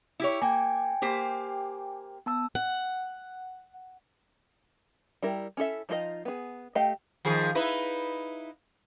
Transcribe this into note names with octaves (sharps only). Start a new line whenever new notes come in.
E4 G4 C#5
A#3 G5 G#5
A#3 G4 C5
B3 A5 E6
F#5
G3 E4 A#4
C#4 E4 A4 E5
F3 D#4 F4 G#4 D#5
B3 G#4
A3 G4 D#5 F5
D#3 F3 G#4
D#4 E4 B4